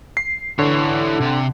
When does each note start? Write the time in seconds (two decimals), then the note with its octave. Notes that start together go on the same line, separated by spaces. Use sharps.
0.17 C7
0.59 D3 E3 C#5
1.20 C3